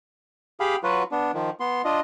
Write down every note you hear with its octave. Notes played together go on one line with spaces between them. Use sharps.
G4 G#4 F5 B5
F#3 F4 F#4 B4
B3 D4
D#3 F3
B3 C6
D4 F4 D#5